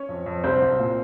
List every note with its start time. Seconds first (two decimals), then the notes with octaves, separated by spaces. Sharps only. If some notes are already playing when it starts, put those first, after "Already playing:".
Already playing: C#4 C#5
0.09 F2
0.26 F2
0.44 C2 C4 C5
0.62 C2
0.79 A#2